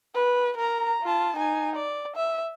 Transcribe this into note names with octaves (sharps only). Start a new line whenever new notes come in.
B4
A#4 A#5
F4 A5
D#4 G#5
D5
E5